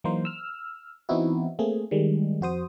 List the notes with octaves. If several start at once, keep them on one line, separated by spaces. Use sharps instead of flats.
E3 F#3 A#3 D#4 A#4 C5
E6 F6
E3 B3 C4 D#4 E4 F#4
A3 A#3 C4 G#4
D#3 G3 G#3
F2 F#4 C5 D#6